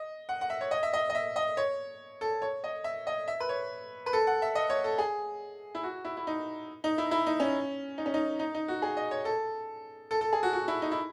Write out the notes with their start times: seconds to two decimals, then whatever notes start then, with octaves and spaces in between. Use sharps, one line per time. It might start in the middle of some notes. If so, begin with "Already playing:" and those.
Already playing: D#5
0.29 F#5
0.41 F#5
0.50 E5
0.61 C#5
0.71 D#5
0.83 E5
0.93 D#5
1.10 D#5
1.15 E5
1.36 D#5
1.57 C#5
2.21 A4
2.42 C#5
2.64 D#5
2.84 E5
3.07 D#5
3.28 E5
3.40 B4
3.49 C#5
4.06 B4
4.13 A4
4.27 F#5
4.42 E5
4.55 D#5
4.70 C#5
4.84 A4
4.98 G#4
5.75 E4
5.83 F#4
6.05 E4
6.17 E4
6.27 D#4
6.84 D#4
6.98 E4
7.11 E4
7.27 D#4
7.40 C#4
7.98 D#4
8.06 C#4
8.14 D#4
8.39 D#4
8.55 D#4
8.68 F#4
8.82 G#4
8.97 D#5
9.11 C#5
9.25 A4
10.11 A4
10.21 A4
10.33 G#4
10.43 F#4
10.53 F#4
10.68 E4
10.82 D#4
10.92 E4